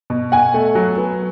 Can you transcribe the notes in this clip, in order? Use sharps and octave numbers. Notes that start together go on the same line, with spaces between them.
B2
B2 F#5 G#5
A3
F#3
B3